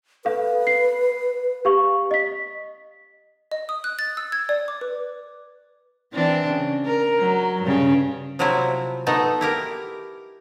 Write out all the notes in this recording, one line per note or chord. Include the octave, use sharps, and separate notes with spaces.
A4 B4 F5
C7
G4 F5 C#6
D#5 B6
D#5
D#6
F#6
A6
E6
G#6
D5
D6
B4
E3 C4 D4
C#3
A#4
F#3
G2 C#3
C3 F3 F#3 C4 E4
A3 B3 D#4 A4
E4 G4 A#4